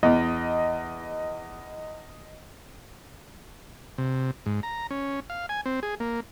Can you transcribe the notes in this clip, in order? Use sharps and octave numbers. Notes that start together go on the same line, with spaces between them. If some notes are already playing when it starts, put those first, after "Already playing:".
E2 D#5
C3
G#2
A#5
C#4
F5
G#5
C4
G#4
A#3